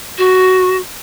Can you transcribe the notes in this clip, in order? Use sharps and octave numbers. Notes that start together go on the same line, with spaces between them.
F#4